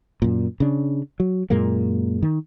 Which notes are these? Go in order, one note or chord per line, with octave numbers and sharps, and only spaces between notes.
F#2 A#2
C#3 D4
F#3
F#2 A#2 G#3 A#3
D#3